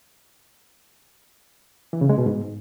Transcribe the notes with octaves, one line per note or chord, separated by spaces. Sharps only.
E3
C#3
G#3
B2
G#2